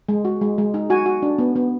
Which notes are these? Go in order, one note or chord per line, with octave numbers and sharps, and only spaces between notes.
G#3
F#4
G#3
G#3
D#4
F#4 G#5
F#4
D4
B3
B3